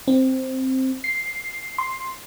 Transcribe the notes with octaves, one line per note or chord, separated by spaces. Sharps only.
C4
C7
C6